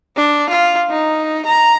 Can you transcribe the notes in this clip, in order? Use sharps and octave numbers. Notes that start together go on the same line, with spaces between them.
D4
F4
D#4
A#5